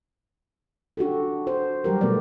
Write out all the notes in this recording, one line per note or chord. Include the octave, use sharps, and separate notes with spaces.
D4 F#4 G4 A4
F#4 C5
F#3 G3 G4 A#4
B2 A3 B3 B4 D5